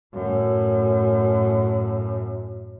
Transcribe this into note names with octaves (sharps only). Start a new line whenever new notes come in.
F#2 A2